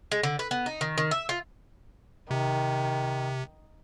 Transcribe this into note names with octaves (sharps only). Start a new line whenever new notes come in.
G#3
D3
B4
B3
D#4
D#3
D#3
E5
F4
C3 D#3